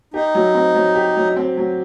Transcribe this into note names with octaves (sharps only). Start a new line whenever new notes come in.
D#4 G4
F#3
C4
F#3
G4
F#3
C4
F#3